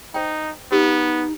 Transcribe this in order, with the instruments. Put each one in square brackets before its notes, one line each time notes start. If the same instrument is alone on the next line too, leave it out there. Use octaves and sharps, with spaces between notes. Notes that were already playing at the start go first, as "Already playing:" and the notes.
[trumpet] D#4 [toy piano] C5 G5
[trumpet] B3 [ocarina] D#4 [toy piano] G4 B4